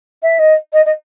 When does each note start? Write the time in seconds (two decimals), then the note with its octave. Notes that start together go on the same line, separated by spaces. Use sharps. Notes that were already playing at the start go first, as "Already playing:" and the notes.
0.22 E5
0.39 D#5
0.73 D#5
0.85 D#5